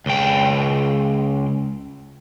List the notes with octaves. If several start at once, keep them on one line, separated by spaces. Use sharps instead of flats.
C#2 G5